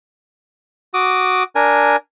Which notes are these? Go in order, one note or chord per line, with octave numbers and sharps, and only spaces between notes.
F#4 D6 D#6
D4 A#4 G#5